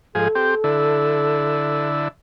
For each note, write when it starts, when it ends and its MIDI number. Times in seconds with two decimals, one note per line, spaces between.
0.15 0.28 44
0.15 0.28 53
0.15 0.28 68
0.15 1.87 69
0.35 0.55 60
0.35 0.55 67
0.64 2.08 50
0.64 2.08 64